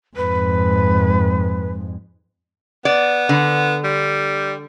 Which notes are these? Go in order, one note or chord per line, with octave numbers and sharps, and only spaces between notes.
F2 G#2 B4
B3 D5
D3
G3